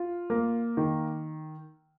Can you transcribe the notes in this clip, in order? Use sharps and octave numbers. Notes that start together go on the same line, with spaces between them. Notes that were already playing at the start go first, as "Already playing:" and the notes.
Already playing: F4
A#3
D#3